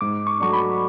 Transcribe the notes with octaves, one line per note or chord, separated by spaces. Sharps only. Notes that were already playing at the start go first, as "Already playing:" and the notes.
G#2 D6
C#6
F#3 A3 D4 C#6
B5